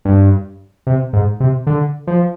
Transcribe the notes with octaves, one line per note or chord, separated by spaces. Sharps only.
G2
C3
G#2
C3
D3
F3